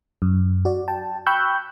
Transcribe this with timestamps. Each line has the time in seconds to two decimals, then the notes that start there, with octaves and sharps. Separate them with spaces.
0.22 F#2
0.65 F#4 D5
0.88 G5 A5
1.26 G5 B5 C#6 E6 F#6 G6